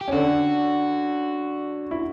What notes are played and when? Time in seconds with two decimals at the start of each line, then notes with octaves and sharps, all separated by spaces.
0.01 G4
0.08 C#4
0.12 D3 D4 F#4
1.91 E4